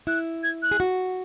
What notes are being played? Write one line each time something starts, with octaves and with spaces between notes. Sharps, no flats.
E4 F#6
G#6
F#6
G#4
F#4